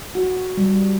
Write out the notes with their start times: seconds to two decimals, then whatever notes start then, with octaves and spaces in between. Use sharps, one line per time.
0.15 F#4
0.57 G3